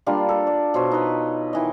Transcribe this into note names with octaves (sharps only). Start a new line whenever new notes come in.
G3 A#3 D4 F4
A4
D5
B2 C5 C#5 C#6
D#4 B4
D#3 E3 D#5